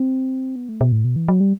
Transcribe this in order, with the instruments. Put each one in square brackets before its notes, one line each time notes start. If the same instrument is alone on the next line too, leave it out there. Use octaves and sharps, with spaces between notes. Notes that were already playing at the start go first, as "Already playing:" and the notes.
Already playing: [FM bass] C4
B3
A3
B2
A2
B2
E3
F#3
G3